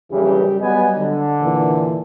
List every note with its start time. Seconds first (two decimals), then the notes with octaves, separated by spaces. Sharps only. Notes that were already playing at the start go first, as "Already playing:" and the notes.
0.12 A#1 F#2 C#3 E3 G3 G4
0.62 F#3 G3 B3 D#5 G#5
0.97 D3
1.41 D#2 A#2 E3